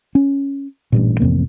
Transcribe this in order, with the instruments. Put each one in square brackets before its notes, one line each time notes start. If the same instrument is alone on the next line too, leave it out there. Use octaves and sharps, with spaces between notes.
[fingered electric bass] C#4
A1 G2 A#2
A1 F2 C3 A#3